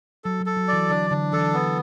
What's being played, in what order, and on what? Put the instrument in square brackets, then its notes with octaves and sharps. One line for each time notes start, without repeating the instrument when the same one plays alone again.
[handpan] F#3 [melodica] A4
[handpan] F#3
[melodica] A4
[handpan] F#3
[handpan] E3 [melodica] D5
[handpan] D3 [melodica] D4
[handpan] D3 [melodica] D4
[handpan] E3 [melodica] A4
[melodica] B3